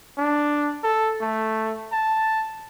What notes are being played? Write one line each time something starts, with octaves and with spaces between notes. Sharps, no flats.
D4
A4
A3
A5